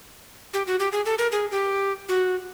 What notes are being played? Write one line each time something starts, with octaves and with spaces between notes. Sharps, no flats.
G4
F#4
G4
G#4
A4
A#4
G#4
G4
F#4